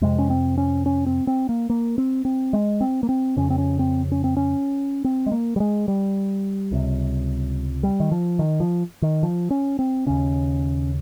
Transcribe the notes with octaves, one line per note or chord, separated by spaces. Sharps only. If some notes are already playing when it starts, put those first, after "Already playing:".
F2 C3 G#3
C#4
C4
C#4
C#4
C4
C4
A#3
A#3
C4
C4
G#3
C4
A#3
C4
F2 C#3 C#4
C4
C#4
C4
C#4
C4
C#4
C4
G#3
A#3
G3
G#3
G3
C#2 C3
G3
D#3
F3
D#3
F3
D#3
F3
C#4
C4
D#2 C#3 C#4